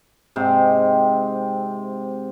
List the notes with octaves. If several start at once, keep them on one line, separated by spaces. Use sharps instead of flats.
G#2 C3 C6